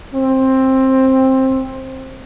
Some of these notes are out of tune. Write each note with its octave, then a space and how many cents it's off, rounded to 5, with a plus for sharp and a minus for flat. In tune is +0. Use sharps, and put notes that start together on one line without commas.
C4 +15